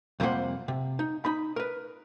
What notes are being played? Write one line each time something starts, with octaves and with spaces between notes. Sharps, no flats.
F2 C3 G3 A#3 C5 F#5
C3
D#4
D#4 B5
A#4 B4